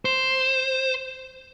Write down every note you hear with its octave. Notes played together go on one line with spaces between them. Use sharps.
C5 E7